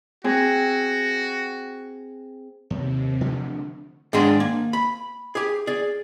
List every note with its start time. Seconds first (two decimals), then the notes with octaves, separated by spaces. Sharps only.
0.24 C4 F#4 G#4
2.70 D#2 C3
3.21 D3 F3 A3
4.13 G#2 D#3 D4 G#4 C6
4.40 A#3
4.73 B5
5.35 G4 G#4
5.67 G#4 D5